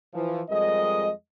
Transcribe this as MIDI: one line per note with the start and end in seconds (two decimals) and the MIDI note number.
0.14 0.42 52
0.14 0.42 53
0.49 1.09 41
0.49 1.09 55
0.49 1.09 56
0.49 1.09 70
0.49 1.09 75